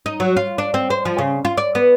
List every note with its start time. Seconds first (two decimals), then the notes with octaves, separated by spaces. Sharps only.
0.06 D#4
0.20 F#3
0.37 F4
0.58 D4
0.74 C4
0.90 C5
1.05 F3
1.18 C#3
1.45 F4
1.57 D5
1.75 B3